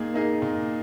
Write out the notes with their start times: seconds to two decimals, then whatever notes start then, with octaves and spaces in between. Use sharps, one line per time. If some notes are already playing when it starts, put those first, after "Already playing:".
Already playing: A#2 A#3 D#4 G#4
0.14 A#3 D#4 G#4
0.42 A#2